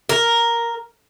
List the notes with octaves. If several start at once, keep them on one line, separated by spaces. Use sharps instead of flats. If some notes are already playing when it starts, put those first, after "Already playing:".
A#4